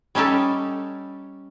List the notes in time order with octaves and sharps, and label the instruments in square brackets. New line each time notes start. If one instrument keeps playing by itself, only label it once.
[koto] G3 C#4 D#4 G4 A4